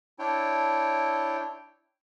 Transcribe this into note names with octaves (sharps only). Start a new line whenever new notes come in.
D4 E4 C#5 G5